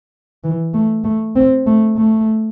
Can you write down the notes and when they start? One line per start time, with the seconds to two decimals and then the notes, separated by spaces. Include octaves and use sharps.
0.44 E3
0.74 A3
1.04 A3
1.36 C4
1.66 A3
1.97 A3